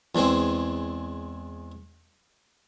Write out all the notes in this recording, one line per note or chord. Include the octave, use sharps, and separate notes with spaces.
E2 E3 G#3 C4